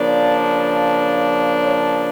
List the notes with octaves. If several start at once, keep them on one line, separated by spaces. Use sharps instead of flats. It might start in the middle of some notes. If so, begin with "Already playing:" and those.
Already playing: C#3 F3 A#3 D4 D5
C#5